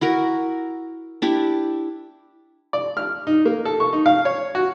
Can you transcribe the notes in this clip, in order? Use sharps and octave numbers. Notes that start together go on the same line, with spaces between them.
E4 F#4 A#4
D4 E4 G4
D5
F6
D#4
A#3
A4
C#6
D#4
F5
C#5
F#4